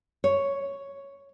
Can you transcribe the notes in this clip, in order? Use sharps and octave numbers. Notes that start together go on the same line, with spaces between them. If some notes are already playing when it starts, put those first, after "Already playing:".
C#5